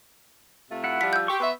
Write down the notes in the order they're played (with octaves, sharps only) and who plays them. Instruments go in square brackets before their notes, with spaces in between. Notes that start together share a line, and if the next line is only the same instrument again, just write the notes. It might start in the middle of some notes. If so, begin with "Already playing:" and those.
[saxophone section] C3 A3 F4
[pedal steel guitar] E4 F#5
[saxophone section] F3 G3 F4 [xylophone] B6
[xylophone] E6 G6
[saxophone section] G4 [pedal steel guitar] C6 C#6
[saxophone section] B3 E5